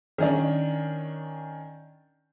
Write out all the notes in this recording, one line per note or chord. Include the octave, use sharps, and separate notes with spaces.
D#3 C#4 D4